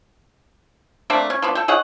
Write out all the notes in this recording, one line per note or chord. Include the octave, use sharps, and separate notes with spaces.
A3 A#3 C4 D4
C#4
F3 B3 D4
A4 G5
G#4 C#5 D#5 F#5